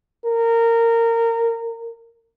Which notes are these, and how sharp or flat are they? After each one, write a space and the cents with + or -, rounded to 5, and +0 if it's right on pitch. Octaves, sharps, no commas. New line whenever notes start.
A#4 -20